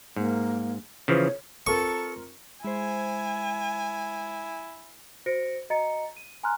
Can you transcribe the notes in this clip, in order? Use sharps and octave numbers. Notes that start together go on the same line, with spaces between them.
G#2 A#3
C#3 E3 F3 C#5
C4 F4 A4 A#4 C#6
G#3 E4 C5 G#5
F#4 C5 A#6 C#7 D7
F#4 D#5 A#5 A6 C#7
D#7
G#5 A#5 C6 F6 F#6